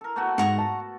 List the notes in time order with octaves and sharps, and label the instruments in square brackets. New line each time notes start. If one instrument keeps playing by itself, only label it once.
[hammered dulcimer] A4 A#4
A3 B3 F#4
[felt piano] G#2 [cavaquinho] F#5 A#5 C#6
[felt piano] A5